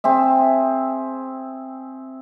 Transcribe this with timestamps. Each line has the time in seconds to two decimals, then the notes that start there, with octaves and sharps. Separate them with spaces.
0.04 C4 G#4 E5